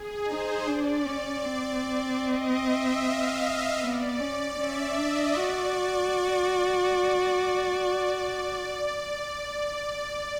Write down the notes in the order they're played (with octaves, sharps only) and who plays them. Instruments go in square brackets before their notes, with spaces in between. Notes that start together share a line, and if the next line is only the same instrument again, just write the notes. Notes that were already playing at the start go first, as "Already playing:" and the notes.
Already playing: [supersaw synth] G#4
[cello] D#4 [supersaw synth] C5
[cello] D4 [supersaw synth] D5
[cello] C#4
C4
[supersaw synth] D#5
E5
F5
[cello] B3 [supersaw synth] D5
[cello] C#4
[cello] C#4 [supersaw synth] E5
[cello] D4 [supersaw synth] D#5
[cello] F#4 [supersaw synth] D5